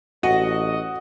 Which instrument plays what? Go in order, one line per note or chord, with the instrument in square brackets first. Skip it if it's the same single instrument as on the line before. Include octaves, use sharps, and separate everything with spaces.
[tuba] A1 [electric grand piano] F#4 [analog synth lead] D#5 [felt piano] F#5